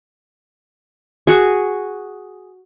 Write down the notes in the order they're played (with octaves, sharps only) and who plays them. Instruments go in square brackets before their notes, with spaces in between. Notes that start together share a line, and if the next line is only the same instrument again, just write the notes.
[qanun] F#4 G#4